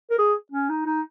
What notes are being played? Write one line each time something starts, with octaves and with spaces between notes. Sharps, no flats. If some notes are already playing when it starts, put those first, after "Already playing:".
A#4
G#4
C#4
D#4
D#4